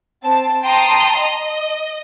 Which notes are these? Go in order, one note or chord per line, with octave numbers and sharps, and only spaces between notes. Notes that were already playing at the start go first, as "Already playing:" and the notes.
C4 A5
G5 A5 A#5 C6 D#6
D#5